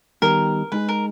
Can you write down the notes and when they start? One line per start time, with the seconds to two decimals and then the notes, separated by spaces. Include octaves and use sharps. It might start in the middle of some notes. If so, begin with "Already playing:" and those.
0.22 D#3 G3 B3 D#4 G4 A#4
0.72 G#3 D#4 G#4 B4
0.89 A#4